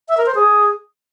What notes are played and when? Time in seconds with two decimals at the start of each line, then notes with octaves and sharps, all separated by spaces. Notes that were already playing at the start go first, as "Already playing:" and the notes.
0.09 E5
0.17 A#4
0.26 C5
0.35 G#4